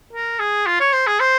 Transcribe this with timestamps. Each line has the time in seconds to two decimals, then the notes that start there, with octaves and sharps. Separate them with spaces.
0.13 A#4
0.39 G#4
0.66 F4
0.80 C#5
0.93 C5
1.07 G#4
1.20 C5